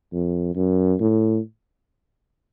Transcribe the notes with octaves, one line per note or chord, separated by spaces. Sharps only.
F2
F#2
A2